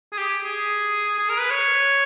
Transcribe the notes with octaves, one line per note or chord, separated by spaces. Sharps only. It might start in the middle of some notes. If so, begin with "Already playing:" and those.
G#4
G4
G#4
G#4
A#4
B4
C#5